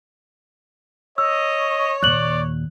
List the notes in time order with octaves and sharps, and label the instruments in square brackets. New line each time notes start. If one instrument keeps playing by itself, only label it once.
[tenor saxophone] C#5 [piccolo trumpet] D#5 [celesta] E6
[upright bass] D#2 A#2 [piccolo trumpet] D5 [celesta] F#6 F#7